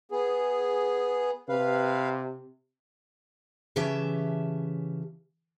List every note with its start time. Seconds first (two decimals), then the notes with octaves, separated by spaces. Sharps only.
0.12 B3 G#4
1.49 C3 B4 F5
3.76 C#3 E3 C#4 G4 E5 A5